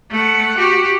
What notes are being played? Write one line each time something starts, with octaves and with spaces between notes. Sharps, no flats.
A3 F#5
F#4 G4